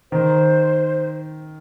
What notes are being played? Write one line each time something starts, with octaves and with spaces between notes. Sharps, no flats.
D#3 C5